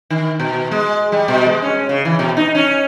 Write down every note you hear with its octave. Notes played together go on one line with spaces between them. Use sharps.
D#3
B2
G#3
G3
B2
G#3
C#4
C#3
E3
B2
D#4
C#4